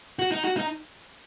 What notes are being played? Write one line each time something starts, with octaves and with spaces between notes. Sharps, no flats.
F#4
D#4
F#4
D#4